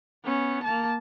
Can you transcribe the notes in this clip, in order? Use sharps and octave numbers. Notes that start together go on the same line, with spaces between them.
B3 C#4
A#3 A5